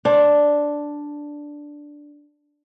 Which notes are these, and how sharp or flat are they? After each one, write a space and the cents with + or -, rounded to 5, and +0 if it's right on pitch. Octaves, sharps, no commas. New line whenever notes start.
D4 +0 C5 +35